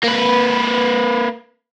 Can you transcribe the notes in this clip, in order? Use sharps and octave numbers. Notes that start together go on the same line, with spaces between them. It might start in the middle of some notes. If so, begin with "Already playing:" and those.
A#3 B4